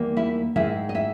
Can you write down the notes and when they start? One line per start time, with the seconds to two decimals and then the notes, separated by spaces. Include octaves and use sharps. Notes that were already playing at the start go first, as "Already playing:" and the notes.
Already playing: E2 D#3 G3 A#3
0.17 E4 E5
0.56 G#2 D#3 G#3 E4 E5
0.89 D#5
0.95 E4 E5